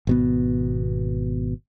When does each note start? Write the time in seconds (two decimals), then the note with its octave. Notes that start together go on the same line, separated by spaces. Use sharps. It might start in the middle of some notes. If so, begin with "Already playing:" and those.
0.07 G#1 B2 B3